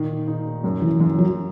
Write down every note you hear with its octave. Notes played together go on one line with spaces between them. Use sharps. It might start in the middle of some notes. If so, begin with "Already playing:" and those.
Already playing: A#2 D#3
D#4
F#2
E3
F#2 E3
F#3